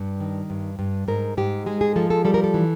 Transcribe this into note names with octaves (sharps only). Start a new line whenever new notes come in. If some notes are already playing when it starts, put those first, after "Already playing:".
Already playing: G2
D#3
G2
G2
G#2 A#4
G#2 G4
G#3 G#4
G#4
F3 A4
A4
G3 A4
A#4
A4
E3